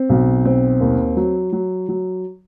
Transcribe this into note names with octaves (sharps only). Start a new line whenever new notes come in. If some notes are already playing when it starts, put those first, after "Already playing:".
Already playing: C4
B1
C4
D#2
F#3
F#3
F#3